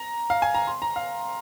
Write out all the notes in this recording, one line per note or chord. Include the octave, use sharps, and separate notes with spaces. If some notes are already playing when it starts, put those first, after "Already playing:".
Already playing: A#5
F5
G#5
A#5
C6
A#5
F5